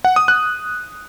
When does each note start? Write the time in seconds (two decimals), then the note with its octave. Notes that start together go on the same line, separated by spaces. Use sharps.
0.05 F#5
0.16 D#6
0.28 F#6